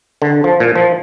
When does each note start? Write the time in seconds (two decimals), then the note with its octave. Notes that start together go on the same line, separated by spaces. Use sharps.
0.22 D3
0.44 F3
0.60 A#2
0.76 F3